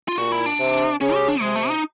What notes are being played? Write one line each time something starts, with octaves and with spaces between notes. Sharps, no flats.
F4
A#2 F#4
E4
D4
C3
C#3 C#4
G4
D4
C3 G#3
A3
D#4